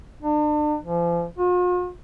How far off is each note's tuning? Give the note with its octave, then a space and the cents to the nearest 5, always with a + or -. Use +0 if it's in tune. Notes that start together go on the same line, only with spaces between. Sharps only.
D4 +40
F3 -35
F4 +45